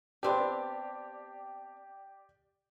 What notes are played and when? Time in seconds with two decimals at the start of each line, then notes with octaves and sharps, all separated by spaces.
0.23 B3 C4 D4 G4 D5